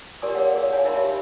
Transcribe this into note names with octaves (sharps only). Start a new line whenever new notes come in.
G4 A#4 D5 G#5 C6 D#6
G#4 A#4 C#5 D5 F5 F#5
G#4 F5
C#5 F5 G#5
D#4 A#4 E5 F5 B5 C6
G4 E5